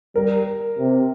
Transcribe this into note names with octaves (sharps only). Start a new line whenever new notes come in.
G3 A#4
C3